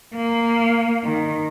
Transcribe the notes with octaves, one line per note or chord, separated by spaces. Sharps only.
A#3
D#3